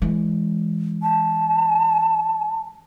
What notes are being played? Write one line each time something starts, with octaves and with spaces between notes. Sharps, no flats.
E3 G#3
A5